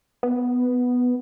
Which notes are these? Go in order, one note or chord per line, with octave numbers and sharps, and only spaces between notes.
B3